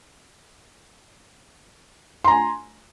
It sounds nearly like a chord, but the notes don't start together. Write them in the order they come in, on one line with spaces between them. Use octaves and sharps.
C6 A#5 G#5